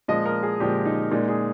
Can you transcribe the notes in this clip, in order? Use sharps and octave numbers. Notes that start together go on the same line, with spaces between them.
A#2 F3 G#3 D#5
A#4
G#4
A#2 F3 G#3 G4
D#4
A#2 G#3 D#4
G#4